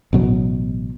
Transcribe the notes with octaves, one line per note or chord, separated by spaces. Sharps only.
A1 B2 F#3